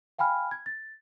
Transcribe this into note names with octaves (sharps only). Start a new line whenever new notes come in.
F5 G5 G#5 B5 F6
G#6
A6